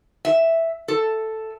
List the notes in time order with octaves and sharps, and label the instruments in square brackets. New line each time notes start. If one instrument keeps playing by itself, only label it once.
[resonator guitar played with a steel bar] E5
A4